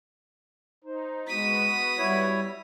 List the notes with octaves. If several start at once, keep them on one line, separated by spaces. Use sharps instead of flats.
D#4 C5
G#3 B3 F#4 D#6 B6
G3 E4 C#5